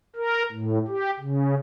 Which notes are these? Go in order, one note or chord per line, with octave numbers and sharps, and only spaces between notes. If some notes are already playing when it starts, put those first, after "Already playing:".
A#4
A2
G4
C#3